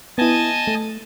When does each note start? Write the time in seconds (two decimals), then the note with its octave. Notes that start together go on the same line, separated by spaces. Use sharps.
0.18 B3 E4 D#5 G#5 A5
0.67 A3